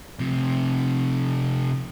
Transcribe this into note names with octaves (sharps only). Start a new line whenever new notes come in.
C3 F3